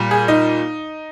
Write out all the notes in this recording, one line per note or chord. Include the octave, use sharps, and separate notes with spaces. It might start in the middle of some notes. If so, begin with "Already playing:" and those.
Already playing: A#2 G3
G#4
D#4